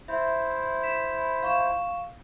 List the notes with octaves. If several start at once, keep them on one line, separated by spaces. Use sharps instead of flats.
E4 C5 E5
B5 B6 E7
F5 C#6 E7